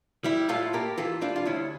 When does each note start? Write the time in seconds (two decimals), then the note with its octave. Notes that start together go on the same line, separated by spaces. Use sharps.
0.24 G3 E4 G4
0.49 A2 F4 A4
0.73 A#3 G4 A#4
0.97 E3 F4 A4
1.21 G3 D4 F4
1.36 F4
1.45 D2 C#4 E4